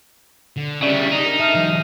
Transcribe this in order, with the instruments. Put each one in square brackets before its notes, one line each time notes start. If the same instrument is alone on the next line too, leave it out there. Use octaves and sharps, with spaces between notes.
[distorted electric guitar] D3
[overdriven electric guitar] C#3 G3 [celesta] D5 [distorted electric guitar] E5
[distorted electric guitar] D4 [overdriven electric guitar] D#4
[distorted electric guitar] A#4
[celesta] E5 F6 C7 [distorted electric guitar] A5
[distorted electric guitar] E3 F#3